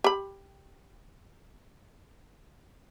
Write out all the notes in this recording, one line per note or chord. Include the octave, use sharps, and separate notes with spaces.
G4 B5